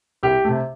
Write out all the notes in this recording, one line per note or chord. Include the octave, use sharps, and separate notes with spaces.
C2 G4
C3 A3